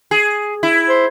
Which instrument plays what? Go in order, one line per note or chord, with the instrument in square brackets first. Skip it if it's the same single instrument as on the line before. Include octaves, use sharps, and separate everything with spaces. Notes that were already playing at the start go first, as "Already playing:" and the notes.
[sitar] G#4
E4
[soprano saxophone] C5